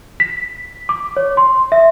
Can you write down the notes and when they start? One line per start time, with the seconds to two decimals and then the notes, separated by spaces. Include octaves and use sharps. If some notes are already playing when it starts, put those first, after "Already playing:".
0.20 B6
0.89 D6
1.17 C#5
1.37 C6
1.72 E5